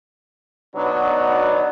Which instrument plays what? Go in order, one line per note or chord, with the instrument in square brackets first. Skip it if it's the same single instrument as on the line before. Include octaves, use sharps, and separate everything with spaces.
[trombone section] B2 F#3 B3 D4 D#4